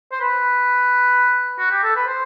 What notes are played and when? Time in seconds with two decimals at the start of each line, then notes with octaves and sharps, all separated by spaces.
0.12 C5
0.21 B4
1.59 F#4
1.71 G4
1.83 A4
1.96 B4
2.07 C5